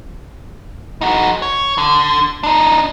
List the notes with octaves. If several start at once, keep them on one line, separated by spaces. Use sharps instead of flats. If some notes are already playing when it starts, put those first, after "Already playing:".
D#4 F#4
C#5
D3
D4 D#4